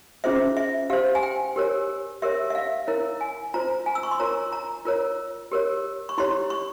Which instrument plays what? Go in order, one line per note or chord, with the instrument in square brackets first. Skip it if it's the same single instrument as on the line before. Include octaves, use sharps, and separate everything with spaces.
[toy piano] C#4 F4 G#4 C5 E5
E5
G4 C5 F5
G#5
G5
G4 A#4 C#5
G4 A#4 C#5 E5
E5
F5
E4 A#4 C#5
G#5
F4 C5 A#5
G#5
E6
C#6
C6
F4 A#4 C#5 A#5
A#5
F4 A#4 C#5
G4 A#4 C#5
C#6
E4 G4 C#5 C6
C#6